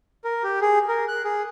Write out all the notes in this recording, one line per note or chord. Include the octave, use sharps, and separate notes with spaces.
A#4
G4
G#4
A#4
F#6
G#4